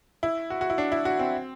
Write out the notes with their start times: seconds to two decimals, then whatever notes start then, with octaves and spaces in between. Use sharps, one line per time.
0.23 E4
0.50 F#4
0.61 F#4
0.70 E4
0.78 D4
0.92 E4
1.05 F#4
1.19 C4